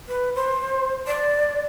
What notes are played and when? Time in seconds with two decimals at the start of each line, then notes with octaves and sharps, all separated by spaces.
0.08 B4
0.35 C5
1.07 D5